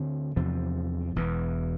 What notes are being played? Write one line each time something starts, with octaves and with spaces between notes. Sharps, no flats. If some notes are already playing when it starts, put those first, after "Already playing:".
Already playing: D2 D3 C4
E2 C3 F3 C4
E1 E2 E3